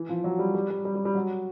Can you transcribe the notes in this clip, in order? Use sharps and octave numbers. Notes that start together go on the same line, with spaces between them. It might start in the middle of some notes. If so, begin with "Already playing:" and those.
Already playing: E3
F3
F#3
G3
G3
G3
G3
G3
G3
F#3